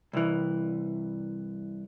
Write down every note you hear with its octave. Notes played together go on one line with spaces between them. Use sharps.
C2 E3